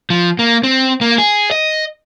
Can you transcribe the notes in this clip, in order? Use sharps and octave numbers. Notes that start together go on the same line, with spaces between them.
F3
A#3
C4
A#3
G#4
D#5